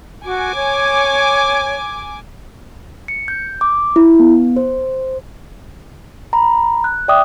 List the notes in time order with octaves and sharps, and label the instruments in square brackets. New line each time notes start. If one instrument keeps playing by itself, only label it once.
[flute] F#4 [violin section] G#5 D6
[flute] C#5
[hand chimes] C#7
G6
D6
E4
B3
C5
A#5 B5
F#6
D5 E5 G5 D6 D#6